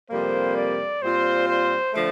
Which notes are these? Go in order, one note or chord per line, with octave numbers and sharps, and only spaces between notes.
F2 C3 G3 A#3 C5
D5
A#2 G3 C4 F4 C5
C5
D3 F3 A3